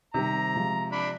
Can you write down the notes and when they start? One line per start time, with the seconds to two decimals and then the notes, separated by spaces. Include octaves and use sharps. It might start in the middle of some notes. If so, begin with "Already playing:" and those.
0.14 C3 D#3 G3 C4 A#5
0.56 F3 G#3
0.92 D4 B5